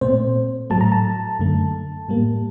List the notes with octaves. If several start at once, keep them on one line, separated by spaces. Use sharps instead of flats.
A#2 A3 C4 C5
A2 F#3 A3 A5
A#5
A5
F#2 D3 A3
A2 G3 A#3